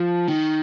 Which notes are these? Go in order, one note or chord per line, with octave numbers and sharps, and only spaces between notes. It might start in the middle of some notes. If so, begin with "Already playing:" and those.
Already playing: F3
D#3